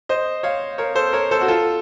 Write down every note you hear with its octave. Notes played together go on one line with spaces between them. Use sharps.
C5 D#5
C#5 F5
A#4 C#5
A4 C5
A#4 C#5
A4 C5
F#4
F4 A4